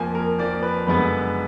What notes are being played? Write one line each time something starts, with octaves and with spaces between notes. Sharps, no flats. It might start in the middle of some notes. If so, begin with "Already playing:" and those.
Already playing: F2 F3 A#3 G#5
A#4
F2 F3 A#3 D5
B4
F#1 F#2 D3 G#3 B3 B4